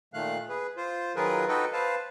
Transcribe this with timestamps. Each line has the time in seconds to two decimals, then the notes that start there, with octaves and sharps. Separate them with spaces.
0.14 A#2 D#3 A3 F5 F#6
0.49 G#4 B4
0.77 F4 C5
1.16 D#3 F#3 F4 G#4 A#4 B4
1.48 D#4 F#4 A4 B4 D#5 G5
1.73 B4 C5 F5 A5